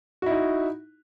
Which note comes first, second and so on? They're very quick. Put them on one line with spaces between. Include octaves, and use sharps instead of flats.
F#4 E4 D#4